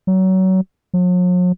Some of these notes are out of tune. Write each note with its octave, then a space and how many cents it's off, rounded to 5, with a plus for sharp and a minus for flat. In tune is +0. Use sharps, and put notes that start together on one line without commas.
F#3 +25
F#3 -45